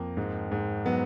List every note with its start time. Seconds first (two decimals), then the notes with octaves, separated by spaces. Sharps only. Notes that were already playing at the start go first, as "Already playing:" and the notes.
Already playing: F2 A#3
0.17 G#2
0.52 G#2
0.86 F#3 B3